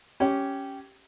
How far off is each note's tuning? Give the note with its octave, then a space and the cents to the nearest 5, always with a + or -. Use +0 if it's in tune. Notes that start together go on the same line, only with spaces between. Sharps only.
C#4 +0 G4 -10 C#5 +0